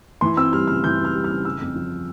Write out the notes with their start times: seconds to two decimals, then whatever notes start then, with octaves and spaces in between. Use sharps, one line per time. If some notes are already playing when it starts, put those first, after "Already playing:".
0.21 E3 C6
0.37 C4 E6
0.53 G3 F6
0.67 C#3 F6
0.84 E3 G6
0.99 C4
1.05 F6
1.15 G3
1.24 F6
1.30 C#3
1.45 C#3 E6
1.61 F2
1.75 F3